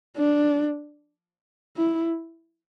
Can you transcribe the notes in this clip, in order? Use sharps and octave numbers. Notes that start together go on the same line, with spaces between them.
D4
E4